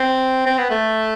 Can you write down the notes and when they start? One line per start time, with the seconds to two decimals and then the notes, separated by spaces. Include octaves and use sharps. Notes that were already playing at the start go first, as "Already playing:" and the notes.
Already playing: C4
0.46 C4
0.58 B3
0.70 A3